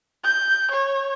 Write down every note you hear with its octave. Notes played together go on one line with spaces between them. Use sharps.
G6
C#5